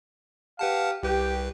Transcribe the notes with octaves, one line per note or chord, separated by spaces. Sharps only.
G4 B4 F5 F#5 A5
C2 G4 B4